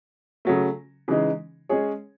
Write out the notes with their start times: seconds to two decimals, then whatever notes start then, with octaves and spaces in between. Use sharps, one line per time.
0.45 C#3 F#3 A3
1.08 C#3 E3 G#3 D#4
1.69 G#3 C#4 G#4 C#5